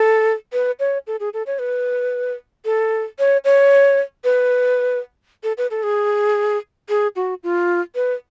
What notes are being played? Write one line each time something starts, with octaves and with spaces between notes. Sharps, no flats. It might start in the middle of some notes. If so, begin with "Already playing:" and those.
Already playing: A4
B4
C#5
A4
G#4
A4
C#5
B4
A4
C#5
C#5
B4
A4
B4
A4
G#4
G#4
F#4
F4
B4